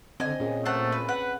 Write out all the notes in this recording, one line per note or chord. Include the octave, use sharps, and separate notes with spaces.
D3 C4 D#5 G#5
A#2 C#4 G#4
A3 C5 F#5 A5
B4
B4 F#5